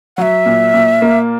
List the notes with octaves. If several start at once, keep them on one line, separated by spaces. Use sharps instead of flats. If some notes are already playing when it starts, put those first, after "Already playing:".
F#3 E5 F#5
A#2
A#2
A#3